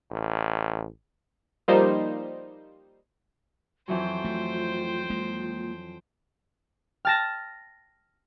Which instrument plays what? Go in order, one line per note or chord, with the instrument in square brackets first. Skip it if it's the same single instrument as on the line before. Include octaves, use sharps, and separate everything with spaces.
[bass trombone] A1
[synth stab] F3 G3 A#3 D#4 C5
[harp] F2 E3 F#3 [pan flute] F4 [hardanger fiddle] C5 G5
[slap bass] A3
G#3 A#3
[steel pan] G5 A5 [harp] F6 A6 A#6